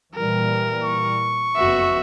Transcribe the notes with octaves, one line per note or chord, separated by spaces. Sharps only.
A#2 E3 G3 A#4
C#6
F#1 F2 B3 F#4 E5